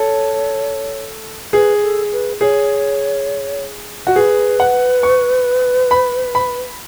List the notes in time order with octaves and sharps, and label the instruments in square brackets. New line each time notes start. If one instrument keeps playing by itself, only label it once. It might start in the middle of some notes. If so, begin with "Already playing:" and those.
Already playing: [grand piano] A4 [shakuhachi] C#5
[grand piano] G#4 [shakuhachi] B4
[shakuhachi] A4
B4
[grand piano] G#4 [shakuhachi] C#5
[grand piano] F#4
[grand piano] G#4 [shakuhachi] B4
[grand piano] F#5
C#6
B5
B5